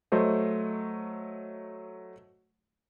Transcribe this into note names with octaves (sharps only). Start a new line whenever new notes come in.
F#3 A3 C5 D#5